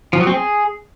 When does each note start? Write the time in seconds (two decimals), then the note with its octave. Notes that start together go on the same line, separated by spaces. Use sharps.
0.13 F3
0.20 F#3
0.27 C4
0.34 G#4